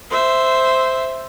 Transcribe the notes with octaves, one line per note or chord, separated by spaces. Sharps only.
C5 E5